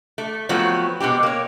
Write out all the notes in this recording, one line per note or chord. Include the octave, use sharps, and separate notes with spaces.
A3
F3 F#3 A3 B3 C4 F#4
B2 G#3 C4 G4
A#3 C#5